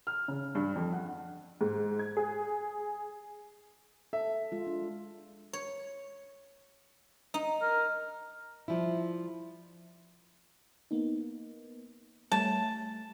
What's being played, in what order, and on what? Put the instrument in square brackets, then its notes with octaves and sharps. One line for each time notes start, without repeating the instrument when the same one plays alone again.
[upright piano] F6
C#3
G2
F2
F#5
[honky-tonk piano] G#2
G#6
G#4
[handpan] A4 [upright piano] E5
[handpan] G#3 F4
D4
[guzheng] C#5
D#4
[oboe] A#4
[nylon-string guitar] F3 G3 E4
[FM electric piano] A#3 B3 D#4
[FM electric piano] G3 A3 [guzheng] A5